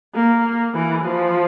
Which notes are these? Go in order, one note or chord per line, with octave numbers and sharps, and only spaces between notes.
A#3
E3
F3